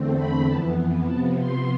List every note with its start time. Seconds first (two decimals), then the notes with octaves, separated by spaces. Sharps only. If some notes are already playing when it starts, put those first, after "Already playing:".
Already playing: E2 D3 A3 C4
0.16 B5
0.47 F2 E3 B3 A5
1.06 C3 F3 B3 A5
1.36 C6